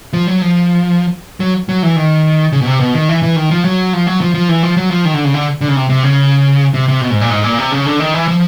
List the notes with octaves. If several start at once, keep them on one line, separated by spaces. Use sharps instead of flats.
F3
F#3
F3
F#3
F#3
E3
D#3
C#3
B2
C3
B2
D#3
E3
E3
D#3
F3
F#3
F3
F#3
F3
F3
E3
F3
F#3
F3
D#3
D3
C#3
D3
D3
C#3
C3
C3
C#3
C3
C3
B2
G#2
A#2
G#2
A#2
C3
C#3
D3
D#3
E3
F3